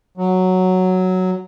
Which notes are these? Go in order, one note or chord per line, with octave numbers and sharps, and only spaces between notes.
F#3